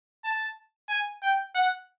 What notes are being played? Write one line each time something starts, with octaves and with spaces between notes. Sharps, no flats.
A5
G#5
G5
F#5